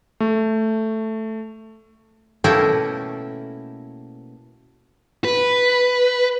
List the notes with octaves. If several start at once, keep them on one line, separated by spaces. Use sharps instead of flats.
A3
B2 A3 A#3 C#4 E4 G5
B4